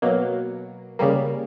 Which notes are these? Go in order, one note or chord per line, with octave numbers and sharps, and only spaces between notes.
B2 F#3 A#3
C#3 G3 A#3